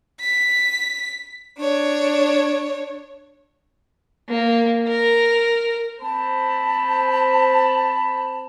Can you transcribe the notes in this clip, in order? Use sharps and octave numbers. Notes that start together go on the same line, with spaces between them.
B6
D4 C#5
A#3
A#4
C4 C5 A5 B5